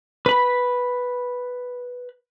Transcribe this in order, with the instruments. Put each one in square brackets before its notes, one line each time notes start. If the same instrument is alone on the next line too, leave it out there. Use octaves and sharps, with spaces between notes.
[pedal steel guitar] B4 B5